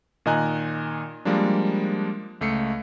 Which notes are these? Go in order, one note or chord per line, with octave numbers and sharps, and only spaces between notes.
A#2 D#3 D#5 G#5 A#5 F#6
F3 G3 G#3 A#3 D4
C#2 A3 C7 C#7